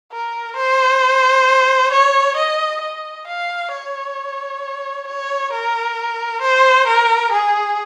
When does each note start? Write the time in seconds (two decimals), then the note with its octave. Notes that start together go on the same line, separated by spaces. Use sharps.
0.12 A#4
0.56 C5
1.92 C#5
2.36 D#5
2.81 D#5
3.27 F5
3.72 C#5
5.07 C#5
5.52 A#4
6.42 C5
6.87 A#4
7.32 G#4